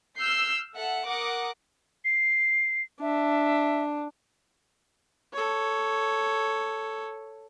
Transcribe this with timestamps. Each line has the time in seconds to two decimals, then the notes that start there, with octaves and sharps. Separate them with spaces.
0.18 E6 F6 G6 C7
0.75 A4 E5 F#5
1.06 A#4 F#5 D6 D#6
2.05 C7
3.01 D4 E5
5.33 A4 C#5